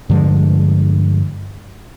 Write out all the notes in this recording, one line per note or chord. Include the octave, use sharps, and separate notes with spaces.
G2 D3 F3 G#3